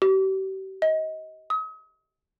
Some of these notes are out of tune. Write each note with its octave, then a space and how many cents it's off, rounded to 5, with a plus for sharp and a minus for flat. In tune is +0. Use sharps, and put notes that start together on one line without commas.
G4 -40
D#5 +25
D#6 +40